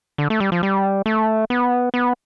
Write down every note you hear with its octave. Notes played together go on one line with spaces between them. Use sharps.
D3
A3
G3
F3
G3
A3
B3
B3